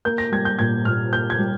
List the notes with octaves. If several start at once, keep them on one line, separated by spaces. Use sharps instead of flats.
A#3 G6
A#6
G3 G#6
G6
A#2 G#6
A#2 F6
A#3 G6
G#6
G3